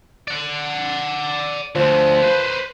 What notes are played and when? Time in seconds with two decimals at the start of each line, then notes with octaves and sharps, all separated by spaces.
0.28 D5 F#5
1.75 D2 D3 F3
2.22 B4 C5